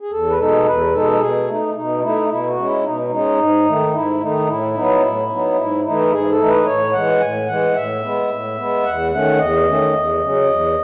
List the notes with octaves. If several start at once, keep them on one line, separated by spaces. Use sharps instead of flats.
G#4
E2 A4
B4
B2 G#3 D#4 A4
E2 B4
B2 G#3 D#4 A4
B2 G#4
A3 D#4
B2 D#4
A3 D#4 E4
B2 E4
F#4
G#3 C#4
E4
B2 D#4
G#3 C#4 D#4
G#2
D#3 A3
G#2 E4
D#3 A3 D#4
A2 E4
F#3 B3 D#4
A2
F#3 B3 D#4
G#2 E4
E3 A3 D#4 E4
G#2 G#4
A4
E3 A3 D#4
B4
A2 C#5
E3 G#3 F#5
A2 G#5
E3 G#3 F#5
A2 E5
G#3 B3
A2
G#3 B3
E2 F#5
D#3 A3 C#4 F#5
E2 D#5
D#3 A3 C#4
E2
C#3 F#3 C#4
E2